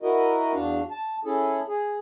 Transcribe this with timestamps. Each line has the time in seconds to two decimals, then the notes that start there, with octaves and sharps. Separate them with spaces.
0.02 E4 F#4 A#4 D#5
0.53 E2 D4 F#4 F5
0.91 A5
1.25 C#4 E4 G#4 A4
1.67 G#4